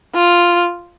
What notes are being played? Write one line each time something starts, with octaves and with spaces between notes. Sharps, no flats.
F4